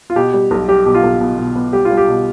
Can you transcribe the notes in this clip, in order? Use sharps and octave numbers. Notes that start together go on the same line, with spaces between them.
F4
B2 G4
G3
B1
G3 G4
B2 G4
F4
B1
B2
B2
B3
G3 G4
F4
G3
G4
B2